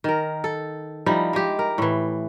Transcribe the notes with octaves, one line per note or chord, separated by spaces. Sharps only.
D#3 A#4
A4
F3 G3 D#4 E4
G#3 G4
A#4
A2 E3